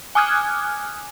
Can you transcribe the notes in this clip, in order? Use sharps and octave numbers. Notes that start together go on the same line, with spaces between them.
G#5 D6 D#6 F6 F#6 G#6